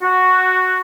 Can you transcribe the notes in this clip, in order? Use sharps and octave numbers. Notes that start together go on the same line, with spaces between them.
F#4